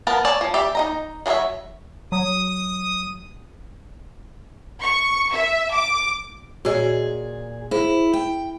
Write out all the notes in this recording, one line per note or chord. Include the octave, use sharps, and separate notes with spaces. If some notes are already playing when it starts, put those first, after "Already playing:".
B3 A#4 F5 A5
C#5 D5 G#5 A5
F3
G4 D5 E5
D#4 D#5 A#5
F#3 F4 G#4 C#5 E5
F#3 D#6
C#6
E5
D6
A#2 F#4 G#4 C#5 D#5
E4 G#4 C5
G5